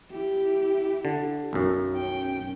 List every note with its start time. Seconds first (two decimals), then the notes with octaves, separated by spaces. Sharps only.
0.11 E4 G4
1.05 D3
1.53 B1 F#2
1.96 C#4 G5